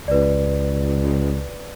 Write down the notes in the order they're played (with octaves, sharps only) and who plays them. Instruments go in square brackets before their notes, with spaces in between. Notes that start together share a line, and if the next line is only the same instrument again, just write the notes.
[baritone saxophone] C#2 [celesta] B4 D5